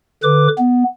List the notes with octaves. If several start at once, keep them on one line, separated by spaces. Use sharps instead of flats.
D3 B4 D6
B3